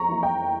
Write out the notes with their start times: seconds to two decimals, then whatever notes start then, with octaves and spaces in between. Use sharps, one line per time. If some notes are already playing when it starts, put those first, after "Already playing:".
Already playing: F2 A#5 C#6
0.08 E3 A#3 E4
0.23 G5